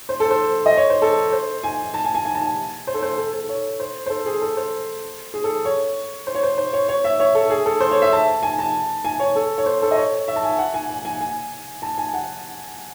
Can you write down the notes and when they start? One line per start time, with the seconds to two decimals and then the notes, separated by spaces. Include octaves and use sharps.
0.09 C5
0.20 A4
0.30 C5
0.66 D#5
0.77 C#5
0.90 C5
1.02 A4
1.33 C5
1.63 G#5
1.94 A5
2.05 G#5
2.15 G#5
2.25 G#5
2.35 A5
2.41 G#5
2.87 C5
2.94 A4
3.02 C5
3.18 A4
3.33 A4
3.49 C#5
3.80 C5
4.06 C5
4.10 A4
4.26 G#4
4.41 A4
4.57 C5
5.34 G#4
5.44 A4
5.65 C#5
6.27 C5
6.35 C#5
6.43 C5
6.58 C5
6.73 C#5
6.88 C#5
7.04 E5
7.20 C#5
7.35 A4
7.50 G#4
7.66 A4
7.81 C5
7.91 C#5
8.02 E5
8.12 A5
8.43 G#5
8.59 A5
9.05 G#5
9.20 C#5
9.36 A4
9.58 C#5
9.66 C5
9.82 A4
9.91 D#5
9.97 C#5
10.28 E5
10.36 A5
10.44 G#5
10.58 F#5
10.74 G#5
10.90 G#5
11.05 G#5
11.21 G#5
11.82 A5
11.98 G#5
12.13 F#5